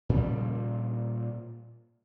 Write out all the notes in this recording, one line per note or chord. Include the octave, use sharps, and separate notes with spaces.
A#2 C#3 F3 G3